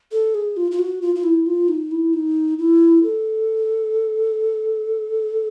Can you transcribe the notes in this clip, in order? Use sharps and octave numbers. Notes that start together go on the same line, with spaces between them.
A4
G#4
F4
F4
F#4
F4
F4
E4
F4
D#4
E4
D#4
E4
A4